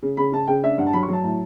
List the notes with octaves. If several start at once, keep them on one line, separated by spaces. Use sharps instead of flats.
C#3
C#3 B5
C#3 A5
C#3 G5
D4 E5
G2 F#5
A5
F#3 B5
C#6
F#3 A5
A2 A5